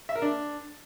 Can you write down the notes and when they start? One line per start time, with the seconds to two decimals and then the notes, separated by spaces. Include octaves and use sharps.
0.09 E5
0.15 A#4
0.22 D4